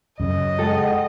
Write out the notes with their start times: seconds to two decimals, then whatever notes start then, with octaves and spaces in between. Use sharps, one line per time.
0.20 F#2 C#3 D#5
0.59 G#3 A4 F#5 G5